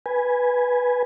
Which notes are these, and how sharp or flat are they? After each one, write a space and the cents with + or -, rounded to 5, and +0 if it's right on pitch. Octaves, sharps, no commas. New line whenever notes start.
B4 -5 G#5 +0